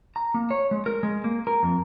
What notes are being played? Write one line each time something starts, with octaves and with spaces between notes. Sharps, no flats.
A#5
A#3
C#5
G#3
A#4
G#3
A#3
A#4
F2